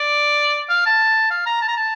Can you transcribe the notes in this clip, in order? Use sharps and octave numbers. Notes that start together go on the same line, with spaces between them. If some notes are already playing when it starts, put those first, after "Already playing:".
Already playing: D5
F5
A5
F5
A#5
A5
A#5
A5